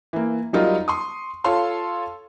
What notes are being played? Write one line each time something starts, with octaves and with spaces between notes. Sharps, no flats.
E3 A#3
F#3 G3 D#4 F4 A#4 D#5
C6 C#6 D#6
F4 A4 C#5 F5 C6 C#6